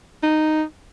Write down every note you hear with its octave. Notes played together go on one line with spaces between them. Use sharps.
D#4